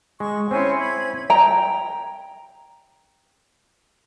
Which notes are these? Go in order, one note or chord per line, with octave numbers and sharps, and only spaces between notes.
G#3 C#6
C4 C#4 E4 C5 C#5 G#5
B5 G#6
G5 A#5